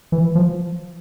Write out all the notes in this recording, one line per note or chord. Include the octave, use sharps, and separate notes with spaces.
E3
F3